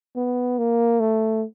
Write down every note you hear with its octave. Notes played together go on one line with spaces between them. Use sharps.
B3
A#3
A3